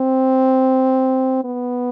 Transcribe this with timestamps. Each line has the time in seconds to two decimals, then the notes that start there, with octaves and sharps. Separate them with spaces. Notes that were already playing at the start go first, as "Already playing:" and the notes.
Already playing: C4
1.44 B3